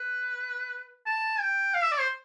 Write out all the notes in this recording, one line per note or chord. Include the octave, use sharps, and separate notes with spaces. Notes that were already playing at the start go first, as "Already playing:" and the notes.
Already playing: B4
A5
G5
F5
E5
D5
C5